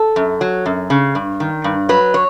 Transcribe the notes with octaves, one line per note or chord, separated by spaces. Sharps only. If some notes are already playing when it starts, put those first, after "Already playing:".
Already playing: A4
F#2
F#3
F#2
C#3
G2
D#3
G2
F#3 B4
C#5